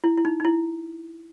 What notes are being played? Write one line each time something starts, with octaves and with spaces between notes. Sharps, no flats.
E4
E4
D#4
D#4
E4